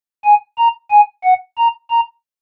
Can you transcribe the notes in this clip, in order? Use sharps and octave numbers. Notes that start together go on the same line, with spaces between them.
G#5
A#5
G#5
F#5
A#5
A#5